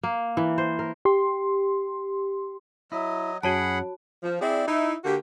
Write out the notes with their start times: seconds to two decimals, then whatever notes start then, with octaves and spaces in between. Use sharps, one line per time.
0.03 A#3
0.37 E3
0.58 C5
0.79 A#4
1.05 G4 C6
2.92 F#3 E4 D#5
3.43 F#2 F#4 G#4 C#5 F#5 A5 B5
4.23 F3
4.41 C4 E4 G#4 D5
4.68 D#4 E4
5.04 D3 A#3 F#4 G4